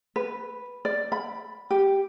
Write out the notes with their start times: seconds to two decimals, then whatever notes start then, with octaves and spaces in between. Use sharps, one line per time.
0.16 B4
0.85 D5
1.12 B5
1.71 G4